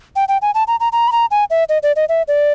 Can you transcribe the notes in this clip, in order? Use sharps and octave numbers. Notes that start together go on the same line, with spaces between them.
G5
G5
G#5
A5
A#5
A#5
A#5
B5
A#5
G#5
E5
D#5
D5
D#5
E5
D5